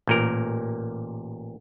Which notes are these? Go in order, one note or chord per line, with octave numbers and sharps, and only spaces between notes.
A1 A#2 A#4